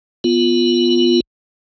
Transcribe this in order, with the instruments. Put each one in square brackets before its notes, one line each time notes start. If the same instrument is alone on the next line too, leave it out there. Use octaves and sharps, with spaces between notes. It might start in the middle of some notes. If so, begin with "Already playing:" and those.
[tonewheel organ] B3 F4